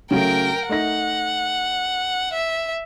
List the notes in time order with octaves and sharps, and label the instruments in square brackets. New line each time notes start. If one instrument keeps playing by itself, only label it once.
[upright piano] C#3 F#3 A3 [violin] A#4 G5
[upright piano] A3 D#4 A#6 [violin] F#5
[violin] E5